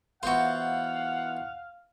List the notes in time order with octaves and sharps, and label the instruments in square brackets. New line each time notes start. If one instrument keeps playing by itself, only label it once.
[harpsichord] E3 B3 F4 [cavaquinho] F#4 C5 [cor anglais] F5 [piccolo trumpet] F#5